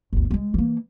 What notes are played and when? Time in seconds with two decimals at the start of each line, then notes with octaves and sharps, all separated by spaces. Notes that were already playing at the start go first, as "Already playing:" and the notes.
0.13 G1 D2
0.31 G#3 A#3
0.54 E3 A#3